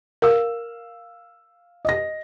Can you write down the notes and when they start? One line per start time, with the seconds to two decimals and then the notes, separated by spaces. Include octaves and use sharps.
0.22 A#4 F5 E6
1.85 D#5 A#6